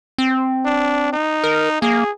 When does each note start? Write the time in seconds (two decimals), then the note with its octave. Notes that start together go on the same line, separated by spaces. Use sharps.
0.18 C4
0.66 D4
1.13 D#4
1.44 A#4
1.82 A#3 G#4